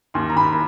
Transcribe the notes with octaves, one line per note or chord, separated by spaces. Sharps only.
D#2 C6
A#5
D#2 B5
B5